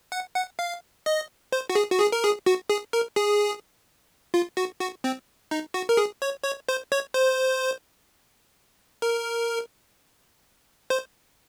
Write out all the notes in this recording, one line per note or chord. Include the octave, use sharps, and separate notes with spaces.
F#5
F#5
F5
D#5
C5
F#4
G#4
F#4
G#4
A#4
G#4
F#4
G#4
A#4
G#4
F4
F#4
F#4
C4
D#4
F#4
A#4
G#4
C#5
C#5
C5
C#5
C5
A#4
C5